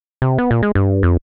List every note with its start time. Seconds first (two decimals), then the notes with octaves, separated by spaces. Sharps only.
0.22 C3
0.38 B3
0.51 A#2
0.63 G#3
0.75 G2
1.03 F2